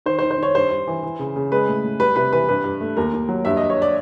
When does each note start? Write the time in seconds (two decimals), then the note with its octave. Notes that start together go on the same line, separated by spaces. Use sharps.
0.06 D#3 C5
0.19 C5
0.23 D#3
0.31 C5
0.38 D#3 C#5
0.55 G2 C5
0.71 G2
0.87 E3
1.03 E3
1.19 C#3
1.36 C#3
1.52 G#3 B4
1.68 A2
1.84 A2
2.00 G3 B4
2.16 C3 B4
2.33 E3 B4
2.49 G2 B4
2.64 G2
2.81 A3
2.97 D#2 A#4
3.13 D#2
3.29 F#3
3.45 G2 E5
3.57 G2 D#5
3.70 C#5
3.82 D5